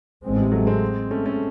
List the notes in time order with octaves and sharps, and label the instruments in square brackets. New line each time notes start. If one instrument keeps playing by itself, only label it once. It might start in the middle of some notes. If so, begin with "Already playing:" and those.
[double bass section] A1 A2 G#3 C4
[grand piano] C3
F#3 A3
G#3 C4
A3 C#4
A3 C#4